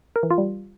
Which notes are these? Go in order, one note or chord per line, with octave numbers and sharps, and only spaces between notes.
A#4
E3
F4
G3